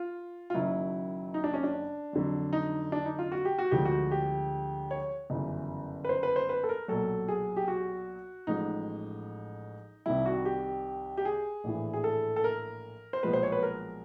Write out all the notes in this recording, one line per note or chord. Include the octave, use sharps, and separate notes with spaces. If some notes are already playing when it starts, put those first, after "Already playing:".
Already playing: F4
F4
F#1 F#2 D#3 F#3 E4
D#4
D4
C#4
D4
F2 D3 F#3
D#4
D4
D#4
F4
F#4
G4
F#4
D2 D3 F3 G#3 G4
F#4
G4
C#5
G1 F#2 C#3 E3
B4
C5
B4
C5
B4
A4
A#4
B1 A#2 F#3 A4
G#4
G4
F#4
A1 A2 F3 G#3 D#4
C2 C3 D#3 G3 E4
F#4
G4
G4
G#4
A#1 A2 E3
G#4
A4
A4
A#4
C5
B1 A#2 F3 G#3 B4
C5
C#5
B4
A#4